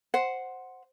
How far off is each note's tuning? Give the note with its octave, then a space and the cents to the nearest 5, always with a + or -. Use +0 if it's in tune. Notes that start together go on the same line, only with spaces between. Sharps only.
C5 +0 F#5 +0